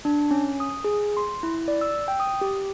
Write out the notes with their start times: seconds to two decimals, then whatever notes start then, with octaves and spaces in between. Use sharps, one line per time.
0.05 D4
0.31 C#4
0.60 D#6
0.84 G#4
1.17 C6
1.43 E4
1.68 D5
1.81 E6
2.08 G5
2.20 D#6
2.41 G4